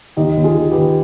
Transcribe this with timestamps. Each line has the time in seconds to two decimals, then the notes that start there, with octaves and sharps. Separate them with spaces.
0.17 D#2 D#4 G4
0.37 D#2
0.44 F4 G#4
0.57 D#3
0.71 G4 B4
0.77 D#2